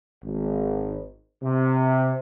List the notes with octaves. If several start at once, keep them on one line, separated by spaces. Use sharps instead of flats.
G#1
C3